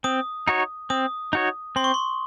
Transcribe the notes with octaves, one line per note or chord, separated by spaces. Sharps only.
C4 D#6
D#4 F#4 C#5
C4 D#6
D#4 F#4 C#5
C4 C6
C#6
C6